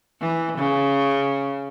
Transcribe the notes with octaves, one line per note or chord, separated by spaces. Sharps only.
E3
C#3